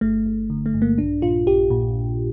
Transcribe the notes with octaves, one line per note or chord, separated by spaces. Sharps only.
G1 A3
G1
D3
A3
G2
A#3
A#1 D4
A#2 F4
A#1 G4
A#2